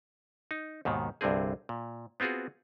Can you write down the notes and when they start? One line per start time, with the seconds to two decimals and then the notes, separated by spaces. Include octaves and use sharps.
0.51 D#4
0.85 D#2 G#2 B2 D#3
1.21 C2 G2 D3 C4 G#4
1.69 A#2
2.20 B3 C4 F4 F#4 G#4